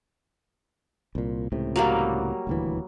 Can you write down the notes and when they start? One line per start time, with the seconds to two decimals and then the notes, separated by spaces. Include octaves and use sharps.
1.15 C2 A#2
1.52 C#2 A2 C3
1.76 F#3 G3 A#3
2.47 D#1 D2 E3